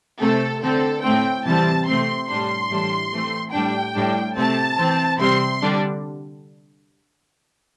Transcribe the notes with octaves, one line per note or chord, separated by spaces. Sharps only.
C3 A3 C4 A4
D3 C4 A4
A2 A3 C4 G5
C3 E3 G3 C4 A5
C3 A3 C4 C6
A2 G3 D4 C6
A2 E3 G3 D4
E3 A3 C4
A2 G3 D4 G5
A2 G3 D4
C3 A3 C4 A5
E3 C4
C3 G3 C4 C6
D3 G3 D4